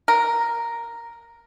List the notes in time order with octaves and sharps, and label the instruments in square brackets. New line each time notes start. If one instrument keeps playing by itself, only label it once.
[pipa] A#4